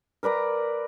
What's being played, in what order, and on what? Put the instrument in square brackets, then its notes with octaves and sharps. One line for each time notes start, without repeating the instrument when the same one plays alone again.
[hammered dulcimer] A#4 B4 D5 A#5